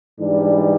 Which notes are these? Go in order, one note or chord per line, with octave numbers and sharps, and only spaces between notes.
G#2 E3 G3 D4